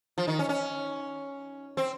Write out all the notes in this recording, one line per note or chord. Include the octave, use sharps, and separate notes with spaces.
F3
D#3
C#4
C#4
C4